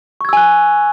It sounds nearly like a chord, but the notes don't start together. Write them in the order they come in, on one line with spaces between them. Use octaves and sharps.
C#6 G#6 E6 G#5 F#6